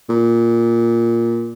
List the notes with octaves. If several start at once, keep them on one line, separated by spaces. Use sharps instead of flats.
A#2